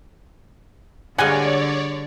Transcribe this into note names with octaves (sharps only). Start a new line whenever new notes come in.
D3 G3 G#3 A#3 C#5 D5 F#5 G#5